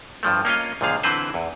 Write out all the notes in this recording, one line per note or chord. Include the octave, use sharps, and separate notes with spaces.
G2 F3 A3
A#3 C#4 F4 D#5
C#2 A#2 D3 F3 G#4 F5
D3 E3 C4 B4 C5
E2